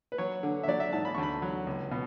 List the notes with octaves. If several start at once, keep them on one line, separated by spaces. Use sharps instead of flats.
B4
F#3 C#5
D3
E5
F#3 D5
E5
G#2 A5
B5
D2 C#6
B5
F#3
C#2
B2